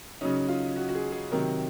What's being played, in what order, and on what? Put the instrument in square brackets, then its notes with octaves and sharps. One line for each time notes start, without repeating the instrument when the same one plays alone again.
[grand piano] C#3 F#3 C#4 D#4
F4
F#4
F#4
G#4
G#4
C3 D#3 F#3 A#4